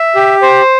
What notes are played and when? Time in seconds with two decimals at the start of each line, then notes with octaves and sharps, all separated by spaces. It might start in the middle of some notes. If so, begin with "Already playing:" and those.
Already playing: E5
0.15 G4
0.42 C5